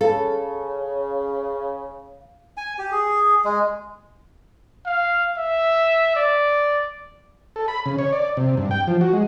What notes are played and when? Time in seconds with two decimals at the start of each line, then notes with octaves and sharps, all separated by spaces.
0.01 C#3 A4 F5
2.57 G#5
2.78 G4
2.91 G#4
3.45 G#3
4.86 F5
5.38 E5
6.16 D5
7.56 A4
7.68 B5
7.86 C#3
7.99 C#5
8.13 D5
8.37 C3
8.57 G2
8.71 G5
8.87 F3
9.01 F#4
9.13 G#3